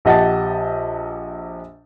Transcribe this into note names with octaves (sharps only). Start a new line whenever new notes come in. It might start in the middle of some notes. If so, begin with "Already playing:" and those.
A#1 G4 D#5 F#5 A5 A6